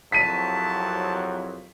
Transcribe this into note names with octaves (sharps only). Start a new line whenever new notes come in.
C2 F2 F#3 A5 B6 D#7